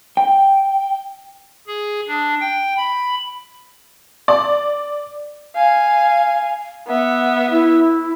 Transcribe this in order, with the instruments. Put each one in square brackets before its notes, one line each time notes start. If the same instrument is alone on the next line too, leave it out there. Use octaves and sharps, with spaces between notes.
[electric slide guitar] G5
[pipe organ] G#4
D4
G5
B5
[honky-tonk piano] D5
[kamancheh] F5 G#5
[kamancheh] B3 E5 [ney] F#5
[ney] E4